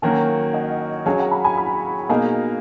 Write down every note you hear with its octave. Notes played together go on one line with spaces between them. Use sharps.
D#3 F#3 A#3 C#4 F#4 F5 G#5
D#5 F#5
F#3 C#4 G#4 F5 G#5
F#5 A#5
G#5 B5
G#5 B5
G#5 B5
B2 A#3 D#4 G#4 F5 G#5